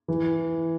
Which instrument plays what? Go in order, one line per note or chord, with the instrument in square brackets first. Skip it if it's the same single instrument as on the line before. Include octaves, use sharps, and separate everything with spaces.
[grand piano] E3